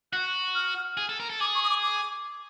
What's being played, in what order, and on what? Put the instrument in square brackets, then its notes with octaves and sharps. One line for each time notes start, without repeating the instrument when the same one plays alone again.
[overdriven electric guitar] F#4 [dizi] F#6
[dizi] F6
[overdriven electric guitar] G#4
A4
A#4
A4
[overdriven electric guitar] G#4 [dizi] D6
[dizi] C#6
D#6
D6
D6